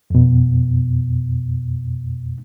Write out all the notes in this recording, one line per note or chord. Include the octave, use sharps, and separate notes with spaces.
F2 B2